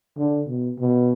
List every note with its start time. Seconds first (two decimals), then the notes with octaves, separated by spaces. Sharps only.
0.17 D3
0.47 B2
0.79 B2